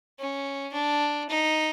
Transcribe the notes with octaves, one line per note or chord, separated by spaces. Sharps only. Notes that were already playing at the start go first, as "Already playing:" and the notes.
C#4
D4
D#4